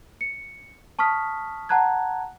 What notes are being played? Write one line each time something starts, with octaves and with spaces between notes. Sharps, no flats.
C#7
A5 C#6 D#6 F6 B6
F#5 A5 A#5 F#6 G#6